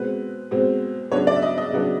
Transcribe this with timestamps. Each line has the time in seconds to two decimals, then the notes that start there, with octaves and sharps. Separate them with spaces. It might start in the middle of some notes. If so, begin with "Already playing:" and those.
Already playing: B2 G#3 C4 B4
0.51 B2 G#3 C4
1.11 C#3 F#3 B3 D4 C#5
1.27 D5
1.35 E5
1.42 D#5
1.58 D#5
1.72 C#3 F#3 B3 D4